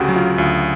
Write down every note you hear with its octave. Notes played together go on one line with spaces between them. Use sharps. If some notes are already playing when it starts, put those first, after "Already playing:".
Already playing: D2 C#3 F#4 G4
F#3
F4
D2 F4